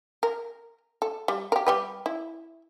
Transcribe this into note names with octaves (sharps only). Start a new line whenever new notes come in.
A#4
A4
G3
G4 A#4
G3 G4 B4
E4